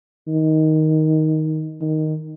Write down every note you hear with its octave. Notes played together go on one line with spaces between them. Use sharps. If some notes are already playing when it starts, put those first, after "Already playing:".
D#3
D#3